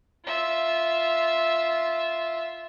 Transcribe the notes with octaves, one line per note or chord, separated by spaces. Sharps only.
F4 E5